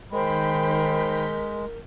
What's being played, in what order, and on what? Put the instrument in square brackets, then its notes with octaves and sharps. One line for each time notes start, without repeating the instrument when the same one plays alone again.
[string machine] D#3 G6 B6 [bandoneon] G#3 [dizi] A#4 [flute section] C5 G5 B5